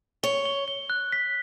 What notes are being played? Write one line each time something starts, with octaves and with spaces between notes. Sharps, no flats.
C#5 G7
G7
G7
F#6
B6